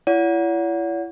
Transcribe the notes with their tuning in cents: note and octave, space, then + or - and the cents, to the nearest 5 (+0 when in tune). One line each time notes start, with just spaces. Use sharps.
E4 +35 C#5 +45 F#5 -15